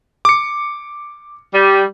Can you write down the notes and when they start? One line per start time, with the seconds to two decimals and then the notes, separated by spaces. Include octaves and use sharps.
0.25 D6 C#7
1.53 G3